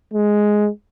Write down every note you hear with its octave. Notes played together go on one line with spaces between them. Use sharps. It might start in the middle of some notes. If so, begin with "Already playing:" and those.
G#3